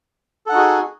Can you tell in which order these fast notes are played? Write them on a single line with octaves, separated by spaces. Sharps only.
A4 F#5 D#4 F#4 G#4